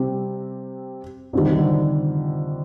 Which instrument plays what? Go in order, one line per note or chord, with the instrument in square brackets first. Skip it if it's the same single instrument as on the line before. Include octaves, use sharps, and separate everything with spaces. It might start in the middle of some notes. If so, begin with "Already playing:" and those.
Already playing: [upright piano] C3 G3 C4 G4
[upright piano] F2 D#3 G3 [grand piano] D3
[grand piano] C3
D3